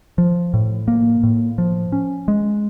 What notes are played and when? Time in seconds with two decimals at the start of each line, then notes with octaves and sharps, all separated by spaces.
0.18 F3
0.54 A2
0.88 A#3
1.23 A2
1.58 F3
1.92 C#4
2.28 G#3